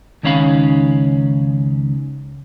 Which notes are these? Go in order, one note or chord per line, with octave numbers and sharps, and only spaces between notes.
C#2 D#3 C#4 C#5 F5 B5